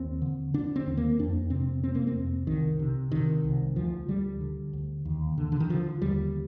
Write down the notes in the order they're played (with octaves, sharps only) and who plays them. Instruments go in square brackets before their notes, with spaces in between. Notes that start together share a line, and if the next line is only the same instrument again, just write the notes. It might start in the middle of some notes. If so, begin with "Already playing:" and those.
Already playing: [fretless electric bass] D#2 C4
D3
D3 D4
C4
D#2
A#3
F2 D4
C3 C4
C3 C4
A#3
C4
F2
C2 D#3
C3
C3 D#3
C2
D2 F3
D3 G3
D3
D2
D#2
D3
D3
D#3
D3 F3
D#2 G3